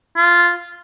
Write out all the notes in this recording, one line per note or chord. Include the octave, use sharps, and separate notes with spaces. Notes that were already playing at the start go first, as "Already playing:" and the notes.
F4